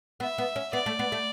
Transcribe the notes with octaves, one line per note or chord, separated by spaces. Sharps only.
B3 E5
B3
C#4
B3 D5
A3
B3
A3